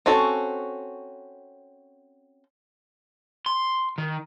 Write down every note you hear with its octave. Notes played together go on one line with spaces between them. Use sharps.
C4 C#4 F#4 A4
C6
D#3